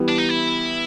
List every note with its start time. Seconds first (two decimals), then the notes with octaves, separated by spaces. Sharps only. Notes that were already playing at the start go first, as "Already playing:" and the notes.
Already playing: E3 G3 B3
0.09 D4
0.18 D#4
0.29 E4